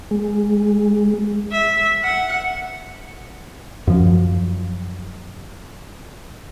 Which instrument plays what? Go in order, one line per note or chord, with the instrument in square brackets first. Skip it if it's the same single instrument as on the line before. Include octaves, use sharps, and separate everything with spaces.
[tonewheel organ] G#3
[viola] E5
F#5
[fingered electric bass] F#2 F3